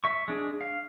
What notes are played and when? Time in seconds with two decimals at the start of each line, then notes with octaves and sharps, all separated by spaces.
0.04 E5 C#6
0.28 G#3 D4 G#4
0.61 F5